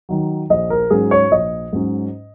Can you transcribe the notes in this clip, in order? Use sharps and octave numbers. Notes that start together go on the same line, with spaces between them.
D#3 F#3
A#1 D#5
A#4
G#2 F#3 C#4 G#4
C#5
A#1 D#5
G#2 F#3 C#4